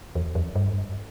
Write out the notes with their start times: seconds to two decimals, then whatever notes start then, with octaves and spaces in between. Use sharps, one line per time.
0.15 E2
0.35 F2
0.56 G2